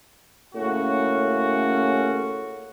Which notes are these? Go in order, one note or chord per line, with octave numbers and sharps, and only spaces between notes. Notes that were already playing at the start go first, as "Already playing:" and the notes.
A2 C#3 A#3 C#4 F#4